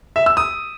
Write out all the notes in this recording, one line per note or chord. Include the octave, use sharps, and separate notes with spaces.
E5
E6
D#6